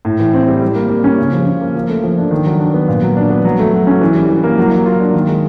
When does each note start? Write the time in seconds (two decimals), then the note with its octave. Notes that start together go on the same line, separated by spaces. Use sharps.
0.05 A2
0.20 E3
0.33 C4
0.48 G3
0.62 G3
0.75 A#3
0.90 G3
1.04 C#4
1.18 C#3
1.32 F3
1.47 C#3
1.61 A#3
1.75 F3
1.89 A3
2.03 F3
2.18 D4
2.31 D#3
2.46 F#3
2.59 D4
2.74 B3
2.88 A#2
3.02 F#3
3.17 D4
3.30 B3
3.45 F#3
3.59 A3
3.73 F#3
3.87 C#4
4.01 E3
4.15 G3
4.29 E3
4.44 A#3
4.58 F#3
4.71 A#3
4.86 F4
5.00 D4
5.14 D#3
5.28 G#3